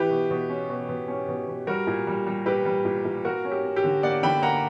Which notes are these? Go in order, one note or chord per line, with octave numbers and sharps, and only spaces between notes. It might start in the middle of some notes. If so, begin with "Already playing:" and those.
Already playing: E3 G4 B4
B2
B2
C#4
B2
B2
C#4
B2
B2
G3 F#4 A#4
A#2
G3
G3
A#2 G4 B4
G3
A#2
A#2
A#3 F#4 A#4
C#4
G4
C#4
G4
D3
A#3 D5 F#5
D3 G5 B5
A#3 F#5 A#5